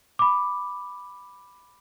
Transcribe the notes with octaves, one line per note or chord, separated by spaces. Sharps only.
B5 D6